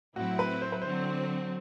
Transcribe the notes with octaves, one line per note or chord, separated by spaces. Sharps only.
A2 F#3 C4 E4 F#4
B4
C5
B4
D3 F#3 C4 C5